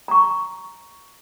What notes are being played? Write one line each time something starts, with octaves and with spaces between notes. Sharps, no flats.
A#5 C#6